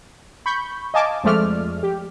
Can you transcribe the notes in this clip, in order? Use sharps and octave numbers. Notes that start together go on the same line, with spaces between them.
B5 C#6 G6
D#5 F5 G#5 A5 D6
F2 F3 G#3 A3 D5 F6
G4